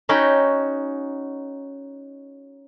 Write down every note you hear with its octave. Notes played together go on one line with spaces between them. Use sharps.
C#4 D#4 F#4 G5 B5